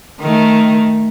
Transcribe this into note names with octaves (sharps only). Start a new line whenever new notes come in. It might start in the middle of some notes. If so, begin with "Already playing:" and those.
D#3 A3